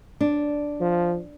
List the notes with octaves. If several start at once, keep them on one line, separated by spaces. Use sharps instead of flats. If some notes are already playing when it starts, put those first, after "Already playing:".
D4
F3